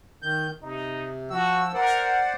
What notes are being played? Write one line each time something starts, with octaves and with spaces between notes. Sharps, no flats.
D#3 G6
C3 D#4
F3 F#4 E6
A#4 C5 D5 F#5